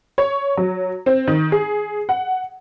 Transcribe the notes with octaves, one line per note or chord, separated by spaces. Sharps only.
C#5
F#3
C4
D#3
G#4
F#5